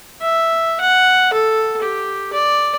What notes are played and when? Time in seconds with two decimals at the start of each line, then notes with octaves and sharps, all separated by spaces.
0.22 E5
0.81 F#5
1.33 A4
1.82 G4
2.33 D5